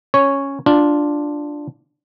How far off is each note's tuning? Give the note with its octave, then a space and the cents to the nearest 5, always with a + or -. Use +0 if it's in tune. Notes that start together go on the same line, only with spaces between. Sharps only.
C#4 -5 C#5 +0
D4 +0 F4 +0